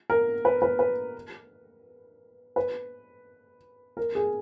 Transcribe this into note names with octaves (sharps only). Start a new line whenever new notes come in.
A#4
B4
B4
B4
B4
A#4
G#4